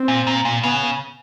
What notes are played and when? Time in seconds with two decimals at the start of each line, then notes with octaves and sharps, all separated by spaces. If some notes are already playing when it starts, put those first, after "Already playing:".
Already playing: C4
0.08 A#2
0.27 A#2
0.45 A#2
0.63 C#3 B3